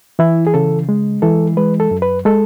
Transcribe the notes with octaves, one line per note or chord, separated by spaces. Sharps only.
E3 E4
G#4
C#3 A4
G#3
E3 A4
G#3 B4
A4
F#2
B4
G#3 A4